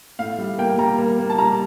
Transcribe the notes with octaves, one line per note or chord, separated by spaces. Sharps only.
A2 F5
G3
A#3 G5
G3 A#5
A#3
A#3
A5
G3 A#5